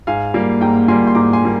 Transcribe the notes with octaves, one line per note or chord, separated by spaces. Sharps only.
G#2 F5 G#5
G3 A#3
G#2 G5 A#5
G3 A#3 G#5 C6
C6
G#2 A#5 D6
G#5 C6
G3 A#3